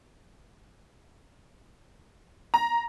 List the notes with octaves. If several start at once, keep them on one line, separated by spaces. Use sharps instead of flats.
A#5